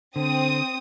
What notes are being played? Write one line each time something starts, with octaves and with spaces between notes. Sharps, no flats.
D3 C4 D#6